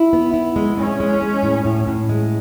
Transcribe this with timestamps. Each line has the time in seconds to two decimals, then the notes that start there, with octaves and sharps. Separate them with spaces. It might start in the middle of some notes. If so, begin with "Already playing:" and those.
Already playing: E4
0.13 B3
0.34 E4
0.56 G#3
0.77 G#3 C#4
1.00 G#3
1.22 G#3
1.43 A2
1.65 A2
1.87 A2
2.09 G#3